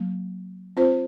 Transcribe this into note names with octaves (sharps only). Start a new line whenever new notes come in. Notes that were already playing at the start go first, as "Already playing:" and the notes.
Already playing: F#3 A#3
C4 F4 C5